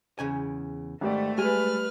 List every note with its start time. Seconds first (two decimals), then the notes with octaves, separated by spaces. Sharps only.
0.19 E2 C#3 G#5
1.01 G#1 A3 G4 D5
1.38 G3 G#3 B4 G#5 F6